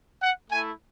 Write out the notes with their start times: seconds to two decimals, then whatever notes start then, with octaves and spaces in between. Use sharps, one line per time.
0.21 F#5
0.51 A3 E4 G#5